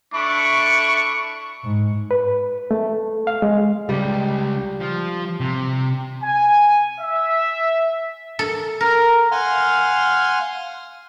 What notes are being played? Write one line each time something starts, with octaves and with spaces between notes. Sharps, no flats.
A3 D4 E4 C#6
G#2
B4
A3
F5
G#3
C#2 G3
F3
C3
G#5
E5
A4
A#4
F5 F#5 G#5 C6 F6